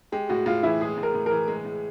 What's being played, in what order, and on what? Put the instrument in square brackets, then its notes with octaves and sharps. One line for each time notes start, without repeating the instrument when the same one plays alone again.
[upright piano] G#3 [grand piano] G4
[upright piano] A2 [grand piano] F#4
[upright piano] A2 [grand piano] F4
[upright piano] E3 [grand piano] E4
[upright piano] G#3 [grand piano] G#4
[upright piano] A2
[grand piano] A#4
[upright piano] A2
[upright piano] E3 [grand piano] A#4
[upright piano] G#3
A2